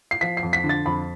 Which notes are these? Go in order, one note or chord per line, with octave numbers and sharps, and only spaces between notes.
C7
F3 B6
C7
F2
B6
D3
A6
F2 B5